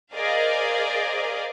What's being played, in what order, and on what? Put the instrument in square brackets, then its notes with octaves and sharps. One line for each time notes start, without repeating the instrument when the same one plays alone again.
[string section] G#4 A#4 C5 D5 D#5 F5